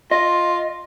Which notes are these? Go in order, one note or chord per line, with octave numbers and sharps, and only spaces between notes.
F4 D#5